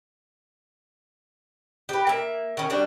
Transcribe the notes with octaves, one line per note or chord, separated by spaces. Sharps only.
G4 B4
A#3 E5
D#3 C#4
F#3 G3 D4